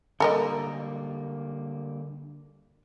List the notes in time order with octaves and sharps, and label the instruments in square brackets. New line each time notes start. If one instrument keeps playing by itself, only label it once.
[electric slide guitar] D3 G3 A#3 [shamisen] A4 A#4 D#5